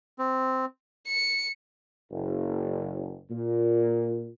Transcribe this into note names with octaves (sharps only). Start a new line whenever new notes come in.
C4
C#7
F#1
A#2